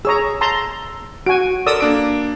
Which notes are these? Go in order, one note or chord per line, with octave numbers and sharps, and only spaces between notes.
G#4 C#5 A#5 E6
A5 A#5 C6
F#4 G#5 D7
A4 A#4 D5 D#6 E6
A#3 D4 D7